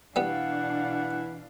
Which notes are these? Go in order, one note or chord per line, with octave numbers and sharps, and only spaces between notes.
B2 E3 G3 B3 D4 F5 F#5